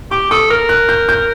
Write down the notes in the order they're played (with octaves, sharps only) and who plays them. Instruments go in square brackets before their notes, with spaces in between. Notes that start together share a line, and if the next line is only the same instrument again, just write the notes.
[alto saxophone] G4 [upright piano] D6
[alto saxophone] A4 [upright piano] D#6
[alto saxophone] A#4 [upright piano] F6
[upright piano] F#6
G6
G6